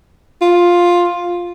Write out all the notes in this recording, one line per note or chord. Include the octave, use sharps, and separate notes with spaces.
F4